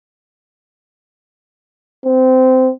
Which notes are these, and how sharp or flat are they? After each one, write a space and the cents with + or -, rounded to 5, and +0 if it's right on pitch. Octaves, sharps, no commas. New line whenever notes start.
C4 -20